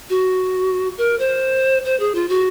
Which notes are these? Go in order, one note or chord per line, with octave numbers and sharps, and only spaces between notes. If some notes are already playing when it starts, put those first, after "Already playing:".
F#4
A#4
C5
C5
G#4
F4
F#4